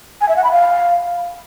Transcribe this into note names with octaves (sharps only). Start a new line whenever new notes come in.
G#5
E5
F#5
B5
F5